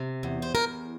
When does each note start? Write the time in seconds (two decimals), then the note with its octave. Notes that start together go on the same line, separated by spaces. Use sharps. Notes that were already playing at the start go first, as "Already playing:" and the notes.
Already playing: C3
0.23 E2
0.42 C5
0.55 E2 A#4